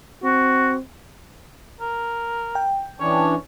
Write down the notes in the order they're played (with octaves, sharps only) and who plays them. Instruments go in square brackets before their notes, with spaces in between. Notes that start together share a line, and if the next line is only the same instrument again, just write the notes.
[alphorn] C4 [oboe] F#4
[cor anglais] A#4
[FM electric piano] G5
[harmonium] E3 C#4 D4 [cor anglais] C#5